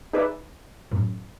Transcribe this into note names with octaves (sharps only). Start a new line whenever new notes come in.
D#4 G#4 B4 D5 E5
F#2 A2